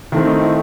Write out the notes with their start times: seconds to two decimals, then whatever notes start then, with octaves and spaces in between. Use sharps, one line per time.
0.12 D#3 A3 C4 E4
0.27 D#4
0.42 E4